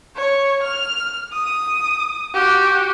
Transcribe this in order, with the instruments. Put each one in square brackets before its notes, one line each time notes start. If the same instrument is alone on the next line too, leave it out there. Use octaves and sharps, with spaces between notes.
[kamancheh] C#5
F6
D#6
F#4 G4